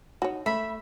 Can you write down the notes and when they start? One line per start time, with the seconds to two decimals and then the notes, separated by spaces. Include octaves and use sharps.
0.22 D#4 F#4 C#5
0.46 A3 E5 B5